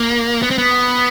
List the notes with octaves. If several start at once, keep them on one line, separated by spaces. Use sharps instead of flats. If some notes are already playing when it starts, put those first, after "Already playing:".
Already playing: A#3
B3
C4
B3